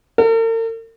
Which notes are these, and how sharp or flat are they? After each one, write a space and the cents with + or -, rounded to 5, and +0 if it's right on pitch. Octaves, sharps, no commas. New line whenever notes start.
A#4 -45